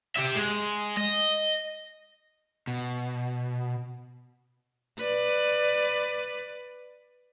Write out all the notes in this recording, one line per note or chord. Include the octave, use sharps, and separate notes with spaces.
G4 E5
G#3
D#5
B2
B4 D5